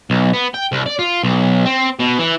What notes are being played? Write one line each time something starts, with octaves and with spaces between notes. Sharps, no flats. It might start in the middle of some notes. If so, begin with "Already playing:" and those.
B1
B3
G5
C2
D5
F4
B1
C4
B2
E3